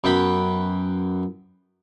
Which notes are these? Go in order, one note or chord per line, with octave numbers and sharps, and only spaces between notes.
F#2 B3 G5 B5